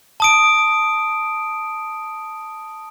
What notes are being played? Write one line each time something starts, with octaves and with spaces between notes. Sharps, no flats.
A5 D#6 D7